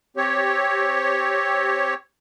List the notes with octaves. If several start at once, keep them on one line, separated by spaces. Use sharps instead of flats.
C4 G4 C#5